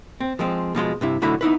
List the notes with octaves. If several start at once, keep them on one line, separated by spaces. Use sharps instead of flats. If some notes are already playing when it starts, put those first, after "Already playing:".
C4
F3 G#3 C4
B2 F3 G#3 C6
G2 C3 E4
B1 A2 D3 E4 F#4 B5
B3 D#4 E4 B4